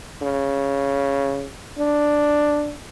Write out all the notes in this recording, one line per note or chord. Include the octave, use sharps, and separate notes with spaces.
C#3
D4